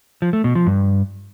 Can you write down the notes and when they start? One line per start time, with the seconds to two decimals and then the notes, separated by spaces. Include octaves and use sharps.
0.22 F3
0.33 A3
0.44 B2
0.55 F3
0.67 G2